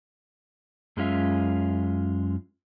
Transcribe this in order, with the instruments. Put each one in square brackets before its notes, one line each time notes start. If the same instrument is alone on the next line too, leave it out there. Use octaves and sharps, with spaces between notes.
[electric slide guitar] F#2 G#3 C#4 F4 E5